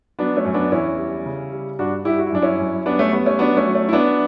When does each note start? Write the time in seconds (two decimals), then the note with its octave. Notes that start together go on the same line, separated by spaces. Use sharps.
0.19 F#3 B3 D4
0.36 A3 C#4
0.45 F#2
0.54 B3 D4
0.72 E2 C#4 E4
0.99 G3
1.26 C#3
1.52 G3
1.79 G2 D4 F#4
2.05 G2 E4 G4
2.19 F#4
2.27 E4
2.32 F#2 D4
2.42 C#4 E4
2.59 F#2
2.86 G3 B3 D4
2.99 A3 C#4
3.13 G3 B3
3.26 A3 C#4
3.39 F#3 B3 D4
3.57 A3 C#4
3.66 F#3
3.75 A3 C#4
3.89 E4
3.93 F#3 B3 D4